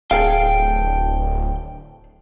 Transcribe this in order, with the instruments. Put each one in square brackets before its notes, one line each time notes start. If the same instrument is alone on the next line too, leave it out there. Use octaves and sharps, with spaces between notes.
[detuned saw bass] D1 [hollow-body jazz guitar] G#4 A4 F5 [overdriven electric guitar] G5